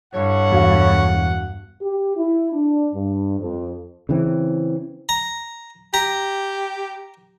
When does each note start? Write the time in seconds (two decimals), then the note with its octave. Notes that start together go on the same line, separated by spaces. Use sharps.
0.14 G2 E4 A4 C#5 F#5
0.51 E1 F#4 F5
1.81 G4
2.16 E4
2.53 D4
2.94 G2
3.40 F2
4.09 C#3 E3 C4
5.09 A#5
5.94 G4 A#5